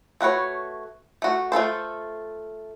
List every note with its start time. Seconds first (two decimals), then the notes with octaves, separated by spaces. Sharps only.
0.21 A3 F#4 B4 C#5
1.22 A3 F#4
1.52 A3 F4 A4 C5